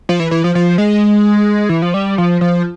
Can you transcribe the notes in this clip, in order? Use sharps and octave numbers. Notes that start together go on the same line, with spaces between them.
F3
E3
E3
F3
F3
G#3
E3
F3
G3
F3
F3